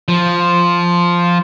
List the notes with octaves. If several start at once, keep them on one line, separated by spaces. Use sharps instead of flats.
F3